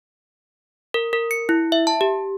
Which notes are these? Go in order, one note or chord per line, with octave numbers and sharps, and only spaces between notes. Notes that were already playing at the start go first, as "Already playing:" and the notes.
A#4
A#4
C#7
E4
E5
A5
G4